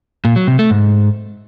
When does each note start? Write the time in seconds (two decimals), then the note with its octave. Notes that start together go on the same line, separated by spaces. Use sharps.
0.25 A#2
0.36 F#3
0.48 C3
0.59 A3
0.70 G#2